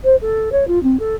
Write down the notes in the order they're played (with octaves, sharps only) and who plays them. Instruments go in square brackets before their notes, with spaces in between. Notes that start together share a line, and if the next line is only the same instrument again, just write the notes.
[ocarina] C5
A4
C#5
F4
C4
A4